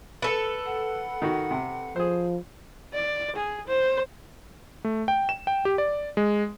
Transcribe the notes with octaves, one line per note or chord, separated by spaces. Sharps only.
A4 B4
F#5
D#3 F#4
C3
F3 G#4 C5
D5
G#4
C5
A3
G5
E7
G5
G4
D5
G#3